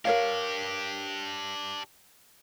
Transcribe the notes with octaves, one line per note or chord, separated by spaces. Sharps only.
D4 G4 A#4 C#5 F5